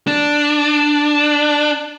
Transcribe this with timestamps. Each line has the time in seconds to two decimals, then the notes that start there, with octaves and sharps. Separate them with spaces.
0.07 D4